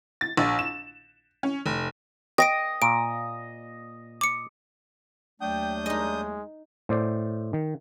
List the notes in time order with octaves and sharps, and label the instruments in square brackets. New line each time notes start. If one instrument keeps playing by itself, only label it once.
[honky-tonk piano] A6
A#1
E7
C#4
F1
[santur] D#5 [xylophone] G5 A#6 D7
[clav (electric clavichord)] A#2 [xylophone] D7
[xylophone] D6 C#7
[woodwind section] D#2 F#3 A3 [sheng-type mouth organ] D4 D#6 G6 [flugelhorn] G5
[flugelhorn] G#3 [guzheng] D#4 D#5
[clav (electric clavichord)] A2 C5 D5
D#3